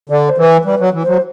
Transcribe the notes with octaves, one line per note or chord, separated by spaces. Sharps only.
D3 D5
C5
E3
B4
G3 B4
F#3
E3
F#3 C5